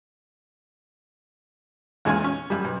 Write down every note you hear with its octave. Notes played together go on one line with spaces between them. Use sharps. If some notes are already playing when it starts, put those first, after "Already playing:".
E2 A#2 G#3 C#4 F4 G#5
C#4
F#2 G3
B1